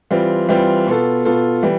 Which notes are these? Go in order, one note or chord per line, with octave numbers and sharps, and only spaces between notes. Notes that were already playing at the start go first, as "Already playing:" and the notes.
E3 G3 C4 F4
E3 G3 C4 F4
B2 B3 F4 A4
B2 B3 F4 A4
E3 G3